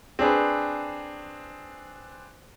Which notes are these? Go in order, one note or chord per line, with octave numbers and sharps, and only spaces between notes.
C4 D4 G#4 B4